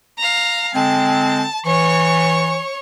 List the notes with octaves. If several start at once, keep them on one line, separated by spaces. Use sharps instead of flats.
F5 A#5
D3 G#3 C4 A5
E3 C#5 C#6